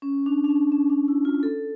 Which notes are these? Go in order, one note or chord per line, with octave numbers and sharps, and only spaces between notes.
C#4
D4
D4
C#4
C#4
D4
E4
F4
A4